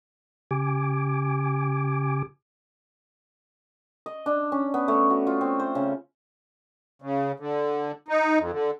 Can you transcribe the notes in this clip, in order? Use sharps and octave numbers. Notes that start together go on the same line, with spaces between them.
C#3 G4 G#5 D6
D#5
D4
C#4
B3
A3
F#4
F4
C4
C5
C#3
C#3
D3
D#4
F2
D3